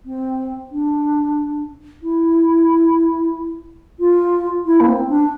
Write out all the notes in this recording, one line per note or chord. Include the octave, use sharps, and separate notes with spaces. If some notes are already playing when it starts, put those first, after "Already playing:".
C4
D4
E4
F4
E4
A#3
C4
D4